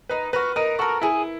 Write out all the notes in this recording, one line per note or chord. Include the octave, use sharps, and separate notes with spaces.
D#4 B4
F#4 A#4 B4
D#4 A#4
F#4 A4 A#4
E4 G#4